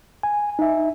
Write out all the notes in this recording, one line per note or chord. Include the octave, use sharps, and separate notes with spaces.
G#5
D#4 E5